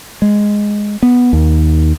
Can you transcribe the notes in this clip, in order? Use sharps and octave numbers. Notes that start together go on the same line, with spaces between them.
G#3
B3
D#2